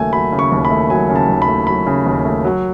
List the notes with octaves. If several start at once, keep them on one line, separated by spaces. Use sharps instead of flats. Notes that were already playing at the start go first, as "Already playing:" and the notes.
Already playing: D#2 C#3 F#3 A3 G#5
F#3 B5
C#3
C#6
D#2
B5
A3
F#3 G#5
C#3
A5
D#2
B5
A3
F#3 B5
C#3
D#2
A3
F#3